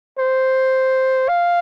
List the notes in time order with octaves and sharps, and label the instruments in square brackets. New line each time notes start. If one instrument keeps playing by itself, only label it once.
[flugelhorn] C5
F5